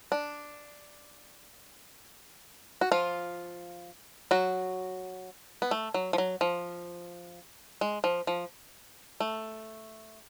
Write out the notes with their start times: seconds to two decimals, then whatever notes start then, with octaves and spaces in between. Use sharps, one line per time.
0.12 D4
2.81 F#4
2.92 F3 F4
4.31 F#3 F#4
5.62 B3
5.71 A3
5.94 F#3
6.13 F3
6.18 F#3
6.41 F3
7.81 G#3
8.04 F3
8.27 F3
9.20 A3